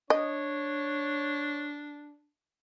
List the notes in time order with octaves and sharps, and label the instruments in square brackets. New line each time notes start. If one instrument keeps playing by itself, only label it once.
[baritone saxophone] D4 [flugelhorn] C#5 [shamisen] D#5